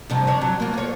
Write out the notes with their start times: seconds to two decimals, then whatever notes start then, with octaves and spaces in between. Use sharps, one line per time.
0.10 G2 C3 F3
0.27 D4 C#5
0.41 F#3
0.60 A#3 F4
0.74 F4 C#5